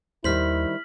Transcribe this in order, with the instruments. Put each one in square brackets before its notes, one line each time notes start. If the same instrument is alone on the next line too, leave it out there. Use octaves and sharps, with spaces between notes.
[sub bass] D#2 [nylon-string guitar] D#3 G3 C5 [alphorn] E4 [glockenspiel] F6 B6 F#7